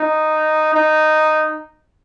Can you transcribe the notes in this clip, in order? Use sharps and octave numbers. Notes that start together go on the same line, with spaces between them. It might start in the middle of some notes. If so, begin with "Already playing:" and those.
Already playing: D#4
D#4